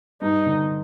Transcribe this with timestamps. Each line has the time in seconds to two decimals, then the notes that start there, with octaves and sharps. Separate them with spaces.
0.21 G2 D#4
0.46 D3